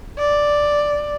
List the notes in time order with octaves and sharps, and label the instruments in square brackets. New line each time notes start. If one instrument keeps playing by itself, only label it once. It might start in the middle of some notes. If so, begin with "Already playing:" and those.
[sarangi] D5